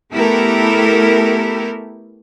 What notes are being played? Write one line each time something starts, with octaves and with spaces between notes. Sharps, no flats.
A3 B3 E4 G4 A4 A#4